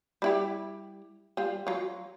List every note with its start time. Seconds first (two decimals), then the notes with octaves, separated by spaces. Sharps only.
0.22 G3 E4 G4
1.37 G3 F4
1.67 F#3 F4